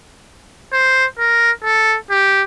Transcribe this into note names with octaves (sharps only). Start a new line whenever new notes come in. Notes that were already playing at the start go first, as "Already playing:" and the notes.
C5
A#4
A4
G4